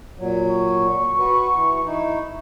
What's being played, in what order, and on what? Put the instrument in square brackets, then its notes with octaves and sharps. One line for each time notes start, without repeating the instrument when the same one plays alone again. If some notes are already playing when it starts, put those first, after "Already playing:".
[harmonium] A#2 F#3
[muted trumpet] C#6
[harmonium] F#4 B4
E3
D#4 E4